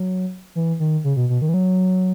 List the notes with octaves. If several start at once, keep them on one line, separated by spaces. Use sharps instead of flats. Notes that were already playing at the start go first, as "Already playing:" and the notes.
Already playing: F#3
E3
D#3
C#3
B2
B2
D#3
E3
F#3